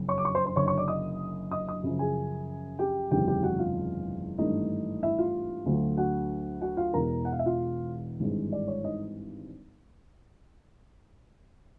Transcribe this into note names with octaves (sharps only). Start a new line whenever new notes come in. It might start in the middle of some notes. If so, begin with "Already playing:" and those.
Already playing: F#1 F2 C#3 F#3
C#5 C#6
D6
C#5 C#6
C5 C6
C5 C6
F#1 F#2 D3 C#5 C#6
C#5 C#6
D5 D6
D#5 D#6
D#5 D#6
D#5 D#6
F#2 C#3 F3
G#4 G#5
G4 G5
F#1 E2 C3 D#3 G#3 G4 G5
G4 G5
F#4 F#5
F4 F5
G#1 G2 E3 A3 D#4 D#5
E4 E5
F4 F5
D2 D3 F#3 A3
F#4 F#5
F#4 F#5
F4 F5
E1 E2 B2 A#4 A#5
F#5
F5
E5
F4 F5
G#1 G2 E3 G#3
D5
C#5
D#4 D#5